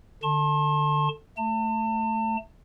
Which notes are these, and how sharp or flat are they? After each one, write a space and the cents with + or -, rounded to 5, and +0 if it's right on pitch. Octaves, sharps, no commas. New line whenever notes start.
D3 +10 A5 +0 C6 +40
A3 +0 A5 +35